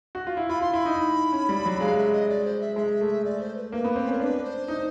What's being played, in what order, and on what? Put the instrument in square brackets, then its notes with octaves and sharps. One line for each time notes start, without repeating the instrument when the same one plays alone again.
[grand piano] F#4
F4
E4
[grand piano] F4 [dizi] B5
[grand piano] F4 [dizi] C6
[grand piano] E4 [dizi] B5
[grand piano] D#4
C#4
G3
F#3
[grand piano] G#3 [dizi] F5
[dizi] E5
D#5
D5
C5
E5
[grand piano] G#3 [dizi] E5
[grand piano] A3
[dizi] D5
C5
B4
[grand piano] A#3 [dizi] B4
[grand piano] B3
C4
[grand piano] C#4 [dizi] A#4
[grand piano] D4 [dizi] B4
[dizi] C5
[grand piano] D#4